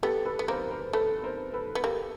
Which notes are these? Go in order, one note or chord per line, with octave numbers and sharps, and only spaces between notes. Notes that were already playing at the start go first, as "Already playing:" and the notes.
B3 G4 A4
A4 B4
B3
A#3 A#4 C5
A#4 C5
A3 A4 B4
A#4 C5
A4 B4
B3
A#3 G4 A4